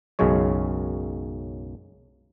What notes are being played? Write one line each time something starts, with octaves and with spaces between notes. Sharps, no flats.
B1 F#2 C#3 G#3 C#5